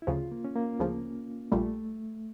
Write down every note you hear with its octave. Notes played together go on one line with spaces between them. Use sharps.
E4
D2 C#3 F3 F4
A#3
C#4
A#3
D2 C#3 F3
A#1 A#2 G3 A3